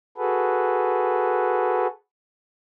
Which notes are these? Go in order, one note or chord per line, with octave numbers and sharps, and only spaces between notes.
F#4 G#4 A4 B4